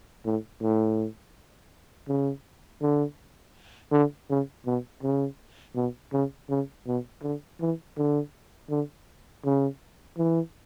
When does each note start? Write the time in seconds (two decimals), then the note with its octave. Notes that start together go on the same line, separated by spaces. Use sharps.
0.25 A2
0.62 A2
2.08 C#3
2.82 D3
3.92 D3
4.29 C#3
4.66 B2
5.03 C#3
5.76 B2
6.13 C#3
6.50 C#3
6.87 B2
7.23 D3
7.61 E3
7.97 D3
8.70 D3
9.45 C#3
10.18 E3